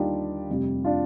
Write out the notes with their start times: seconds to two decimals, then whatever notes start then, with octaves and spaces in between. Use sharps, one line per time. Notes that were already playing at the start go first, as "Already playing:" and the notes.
Already playing: D#2 D3 G3 A#3 D4 D#4 F4 G4
0.49 F1 F2 C3 G3
0.84 D4 F4